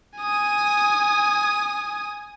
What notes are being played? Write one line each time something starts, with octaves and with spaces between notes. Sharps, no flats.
G#5 D#6